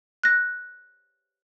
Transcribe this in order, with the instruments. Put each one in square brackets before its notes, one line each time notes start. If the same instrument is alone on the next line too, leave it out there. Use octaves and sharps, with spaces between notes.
[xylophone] F#6 A#6